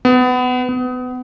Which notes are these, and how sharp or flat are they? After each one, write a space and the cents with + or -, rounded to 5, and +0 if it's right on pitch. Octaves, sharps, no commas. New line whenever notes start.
B3 +25
B3 +30